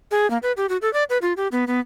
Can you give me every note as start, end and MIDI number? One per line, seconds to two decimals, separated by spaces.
0.11 0.29 68
0.30 0.38 58
0.43 0.52 71
0.57 0.66 67
0.69 0.77 66
0.82 0.92 69
0.93 1.04 74
1.10 1.18 71
1.22 1.33 65
1.37 1.48 67
1.52 1.65 59
1.67 1.80 59